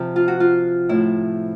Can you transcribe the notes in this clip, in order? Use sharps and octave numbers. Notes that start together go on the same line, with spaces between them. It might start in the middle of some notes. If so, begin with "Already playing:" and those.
Already playing: C3 F3
F4
F#4
F4
A2 F3 E4